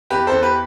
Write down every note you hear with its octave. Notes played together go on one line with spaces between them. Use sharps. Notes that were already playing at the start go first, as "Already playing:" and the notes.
E2 G4 B4
E2 A4 C5
G4 B4